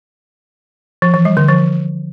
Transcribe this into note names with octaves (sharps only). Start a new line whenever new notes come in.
F3
E3
G3
D3
F3